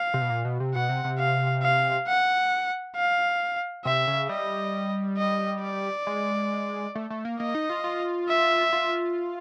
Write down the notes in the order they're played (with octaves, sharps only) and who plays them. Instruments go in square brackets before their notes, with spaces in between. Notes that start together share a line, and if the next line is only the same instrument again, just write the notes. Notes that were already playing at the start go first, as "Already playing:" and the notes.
Already playing: [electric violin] F5
[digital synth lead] C3
B2
A#2
B2
C3
[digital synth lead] B2 [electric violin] F#5
[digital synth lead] C3
C3
[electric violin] F5
F5
F#5
F5
[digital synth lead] C3 [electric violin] E5
[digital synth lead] C#3
[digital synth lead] G3 [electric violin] D#5
[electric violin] D#5
D5
[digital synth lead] G#3
A3
A3
A#3
[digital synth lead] A#3 [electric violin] D#5
[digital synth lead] D#4
F4
F4
[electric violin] E5
[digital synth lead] F4